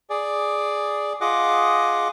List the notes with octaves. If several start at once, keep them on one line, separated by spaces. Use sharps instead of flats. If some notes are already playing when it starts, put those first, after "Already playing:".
G#4 D5
F4 G#4 D#5 F#5 D6